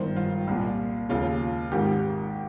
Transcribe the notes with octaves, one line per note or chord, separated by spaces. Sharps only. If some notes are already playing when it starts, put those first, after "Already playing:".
Already playing: G1 G2 D#3 C5
F4
C2 A#2
D#2 C#3 F4
G#1 G#2 D#3 G4